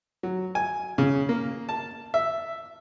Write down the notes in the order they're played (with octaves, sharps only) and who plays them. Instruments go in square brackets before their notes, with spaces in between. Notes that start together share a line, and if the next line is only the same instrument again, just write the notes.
[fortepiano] F#3
G#5
C#3
A#3
A5
E5